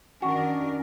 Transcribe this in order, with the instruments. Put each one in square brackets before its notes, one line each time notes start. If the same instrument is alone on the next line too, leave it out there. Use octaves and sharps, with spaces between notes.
[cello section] D#3 D4 A#4 [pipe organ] C#4 [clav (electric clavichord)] F#4